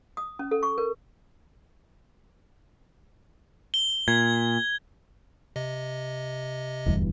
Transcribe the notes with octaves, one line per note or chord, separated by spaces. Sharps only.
D#6
C#4
A4
C#6
A#4
G7
A#2 G#6
C3 D#5
D1 E2 G2